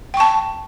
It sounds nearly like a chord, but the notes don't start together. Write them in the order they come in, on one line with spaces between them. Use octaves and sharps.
G5 C#6 A5